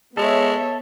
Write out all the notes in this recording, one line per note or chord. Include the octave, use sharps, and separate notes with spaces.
G#3 B3 A4 C#5 E5